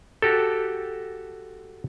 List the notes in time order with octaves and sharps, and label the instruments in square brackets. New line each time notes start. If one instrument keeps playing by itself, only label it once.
[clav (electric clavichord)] F#4 G4 A4